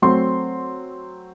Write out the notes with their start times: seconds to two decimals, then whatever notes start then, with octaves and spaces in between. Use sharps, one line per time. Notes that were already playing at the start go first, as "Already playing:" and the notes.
0.02 F#3 A3 C4 C6